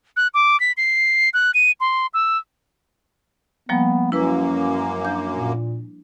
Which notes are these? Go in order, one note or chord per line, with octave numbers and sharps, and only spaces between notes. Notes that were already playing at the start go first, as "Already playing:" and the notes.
F#6
D6
B6
C7
F#6
D#7
C6
E6
F3 G3 A#3 B3
F#2 A#3 C#4 E4 B4
D4 G6
A#2